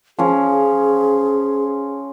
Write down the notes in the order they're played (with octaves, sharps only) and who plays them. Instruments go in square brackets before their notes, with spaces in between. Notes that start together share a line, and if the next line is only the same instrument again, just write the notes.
[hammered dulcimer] F3 C#4 [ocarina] G#4